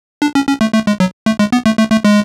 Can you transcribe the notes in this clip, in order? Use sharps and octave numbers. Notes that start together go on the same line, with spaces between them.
D4
C#4
C#4
A3
A3
G#3
F#3
A3
G#3
B3
A3
A3
A3
G#3